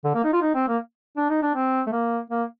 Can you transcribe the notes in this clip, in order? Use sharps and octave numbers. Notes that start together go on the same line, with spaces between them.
D3
A#3
D#4
F4
D#4
C4
A#3
D4
D#4
D4
C4
A3
A#3
A#3